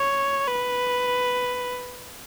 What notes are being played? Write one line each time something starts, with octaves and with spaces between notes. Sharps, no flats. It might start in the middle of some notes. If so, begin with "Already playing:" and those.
Already playing: C#5
B4